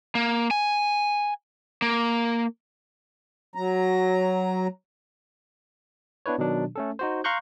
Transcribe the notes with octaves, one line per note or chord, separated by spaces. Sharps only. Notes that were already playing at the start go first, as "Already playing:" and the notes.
A#3
G#5
A#3
F#3 A#5
B3 D4 E4 B4 C#5
B2 D#3 F#3 D4
A3 C#4 A4
D#4 F#4 C5
F5 A#5 C6 C#6 F#6 G6